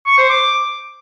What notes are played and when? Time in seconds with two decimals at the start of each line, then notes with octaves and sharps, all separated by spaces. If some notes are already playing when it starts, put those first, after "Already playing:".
0.06 C#6
0.18 C5
0.30 D6